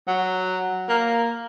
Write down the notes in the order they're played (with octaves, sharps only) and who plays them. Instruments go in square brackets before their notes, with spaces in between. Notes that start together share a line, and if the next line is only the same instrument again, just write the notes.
[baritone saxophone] F#3
A#3